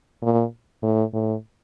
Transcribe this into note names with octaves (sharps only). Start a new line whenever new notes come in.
A#2
A2
A2